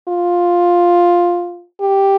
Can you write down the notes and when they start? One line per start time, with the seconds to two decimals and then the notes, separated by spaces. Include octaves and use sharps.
0.08 F4
1.81 G4